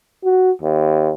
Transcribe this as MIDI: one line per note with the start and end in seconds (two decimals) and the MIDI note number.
0.24 0.51 66
0.62 1.12 39